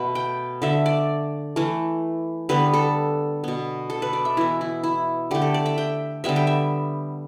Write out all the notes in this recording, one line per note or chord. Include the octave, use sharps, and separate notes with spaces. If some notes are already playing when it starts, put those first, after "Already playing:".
Already playing: B2 A3 B4
G5
D3 A3 E5
D5
E3 A3
D3 G3 B3 B4
A4
B2 B3
A4
B4
D5
E5
E3 B3 E4
E4
E4
D3 A3 G4
A4
D5
E5
G5
D3 G3 B3 E5
G5
E5